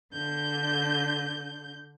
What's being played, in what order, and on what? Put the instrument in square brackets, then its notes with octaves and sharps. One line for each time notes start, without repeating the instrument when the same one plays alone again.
[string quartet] D3 G6